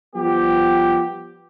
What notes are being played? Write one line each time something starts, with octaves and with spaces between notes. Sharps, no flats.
F3 G3 B3 G4